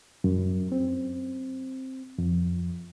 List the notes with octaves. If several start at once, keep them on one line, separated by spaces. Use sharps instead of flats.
F#2
C4
F2